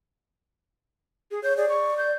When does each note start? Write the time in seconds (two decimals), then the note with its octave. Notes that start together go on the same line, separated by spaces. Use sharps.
1.31 G#4
1.44 C#5 G6
1.57 G#4 D5
1.69 C#6
1.98 G6